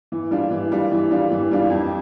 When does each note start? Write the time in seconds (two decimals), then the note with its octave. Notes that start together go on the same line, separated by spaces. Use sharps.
0.12 E3
0.31 G3 D4 F4
0.51 E3
0.72 G3 D4 F4
0.92 E3
1.11 G3 D4 F4
1.31 E3
1.51 G3 D4 F4
1.70 F2